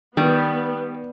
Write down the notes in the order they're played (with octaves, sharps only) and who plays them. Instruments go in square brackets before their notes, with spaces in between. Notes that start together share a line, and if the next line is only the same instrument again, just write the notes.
[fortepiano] D#3 [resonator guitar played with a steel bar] G3 [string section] B3